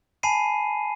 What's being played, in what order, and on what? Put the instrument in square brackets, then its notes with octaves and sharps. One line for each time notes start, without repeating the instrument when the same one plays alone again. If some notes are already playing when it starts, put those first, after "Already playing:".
[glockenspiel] G#5 A5 B5 C7 D#7